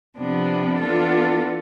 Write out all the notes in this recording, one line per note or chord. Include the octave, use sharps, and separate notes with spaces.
C3 F3 B3 D4
E3 B3 D4 F4 A4